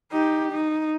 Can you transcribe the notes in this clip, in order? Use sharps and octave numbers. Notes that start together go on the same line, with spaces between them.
D#4 G4
D#4